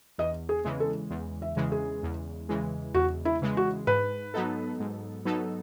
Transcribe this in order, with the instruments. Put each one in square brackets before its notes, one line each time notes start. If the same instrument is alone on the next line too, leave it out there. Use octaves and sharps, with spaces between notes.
[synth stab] E2 [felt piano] D#5
[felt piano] G#4
[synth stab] C#3 E3 G#3
[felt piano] A4
[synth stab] E2
[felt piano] E5
[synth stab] C#3 E3 G#3
[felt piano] G#4
[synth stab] E2
C#3 E3 G#3
[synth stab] E2 [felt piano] F#4
[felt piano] E4
[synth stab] C#3 E3 G#3
[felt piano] F#4
[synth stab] G#2 [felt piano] B4
[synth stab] F#3 B3 D#4 A4
G#2
F#3 B3 D#4 A4